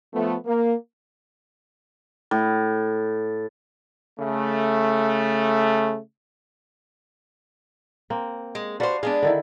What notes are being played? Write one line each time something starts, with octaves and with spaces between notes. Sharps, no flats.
F3 A3 B3
A#3
A2
C#3 A3
A#3 C4
G#3
D4 F#4 B4 C5 F5
G#3 B3 D4 G#4 F5
D3 D#3 E4